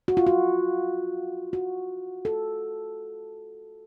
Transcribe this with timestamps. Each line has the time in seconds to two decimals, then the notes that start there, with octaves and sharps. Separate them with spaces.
0.08 F#4
0.17 F4
0.27 F#4
1.53 F#4
2.25 A4